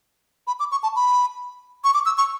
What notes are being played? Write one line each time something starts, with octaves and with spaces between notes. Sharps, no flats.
B5
D6
C#6
A5
B5
C#6
D6
E6
C#6